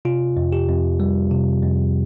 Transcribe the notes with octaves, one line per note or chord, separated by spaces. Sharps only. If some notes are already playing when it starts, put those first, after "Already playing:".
C3 F4
F2
G4
F2
G3
C3
F2